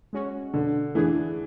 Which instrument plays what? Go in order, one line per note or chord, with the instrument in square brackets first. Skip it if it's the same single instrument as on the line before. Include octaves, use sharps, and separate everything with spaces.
[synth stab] G#3 C#4 F#4
[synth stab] B2 [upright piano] D3
[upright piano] E3 [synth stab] A3 D4 G#4